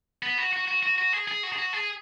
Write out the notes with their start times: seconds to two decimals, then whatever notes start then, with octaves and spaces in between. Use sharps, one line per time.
0.23 B3
0.38 F#4
0.53 F#4
0.68 F#4
0.83 F#4
0.98 F#4
1.13 G#4
1.28 G#4
1.43 F#4
1.52 G#4
1.58 F#4
1.73 G#4